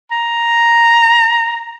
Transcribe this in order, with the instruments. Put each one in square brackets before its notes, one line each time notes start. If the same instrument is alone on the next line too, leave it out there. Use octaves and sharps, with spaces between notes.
[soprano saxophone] A#5